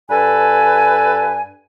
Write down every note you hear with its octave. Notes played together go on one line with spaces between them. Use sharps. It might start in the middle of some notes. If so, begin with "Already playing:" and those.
G2 A4 B4 G#5